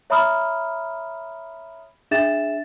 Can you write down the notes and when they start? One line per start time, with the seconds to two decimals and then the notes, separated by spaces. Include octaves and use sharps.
0.10 C#5 E5 A#5 B5 D#6 F6
2.11 D4 G#4 E5 A6 E7